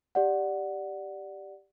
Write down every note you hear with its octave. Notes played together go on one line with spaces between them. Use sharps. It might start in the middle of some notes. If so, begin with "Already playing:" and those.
G4 D5 F#5